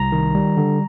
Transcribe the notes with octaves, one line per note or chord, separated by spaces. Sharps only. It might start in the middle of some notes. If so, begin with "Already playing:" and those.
Already playing: C2 A#5
D#3
G3
D3